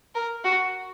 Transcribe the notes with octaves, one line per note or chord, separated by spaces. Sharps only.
A#4
F#4